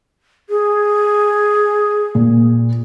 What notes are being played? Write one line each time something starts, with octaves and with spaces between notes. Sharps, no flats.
G#4
A#2